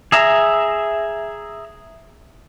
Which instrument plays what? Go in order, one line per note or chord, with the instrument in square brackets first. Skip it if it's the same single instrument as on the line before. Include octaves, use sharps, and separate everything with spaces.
[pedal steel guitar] G#4 E5 A#5